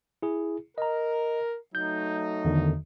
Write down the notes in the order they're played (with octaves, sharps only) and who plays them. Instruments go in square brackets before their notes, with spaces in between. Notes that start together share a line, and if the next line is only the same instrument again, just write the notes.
[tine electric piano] E4 G#4
[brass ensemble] A#4 [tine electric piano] D#5 A#5
[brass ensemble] F#3 A3 D#4 [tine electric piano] G6
[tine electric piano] E2 D3 D#3